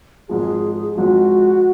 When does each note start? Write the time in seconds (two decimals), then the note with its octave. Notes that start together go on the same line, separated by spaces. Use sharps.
0.29 G#1 G#2 F3 G#4
0.95 G#1 G#2 F3 F#4